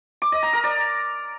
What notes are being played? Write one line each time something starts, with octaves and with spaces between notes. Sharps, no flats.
D6
D#5
A#5
A#4
D5